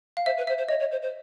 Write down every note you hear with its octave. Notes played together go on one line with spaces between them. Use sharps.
F5
C5 E5
B4
C5 E5
C5
C#5 D#5
C#5
C5
C5